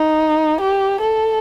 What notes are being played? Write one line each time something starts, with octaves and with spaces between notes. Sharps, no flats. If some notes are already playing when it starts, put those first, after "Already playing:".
Already playing: D#4
G4
A4